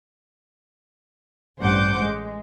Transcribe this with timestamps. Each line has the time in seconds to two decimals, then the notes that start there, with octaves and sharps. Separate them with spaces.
1.60 A1 G2 C5 F#5 D6 G6
1.99 G#3